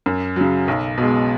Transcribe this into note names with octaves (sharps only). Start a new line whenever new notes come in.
F#2
C#3 F#3
B1
B2 G#3